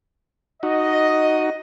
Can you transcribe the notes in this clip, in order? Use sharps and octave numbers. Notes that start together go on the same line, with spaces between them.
D#4 F#4 D#5